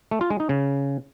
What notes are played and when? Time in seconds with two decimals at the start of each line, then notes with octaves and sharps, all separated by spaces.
0.11 A3
0.21 F4
0.30 G#3
0.40 D#4
0.49 C#3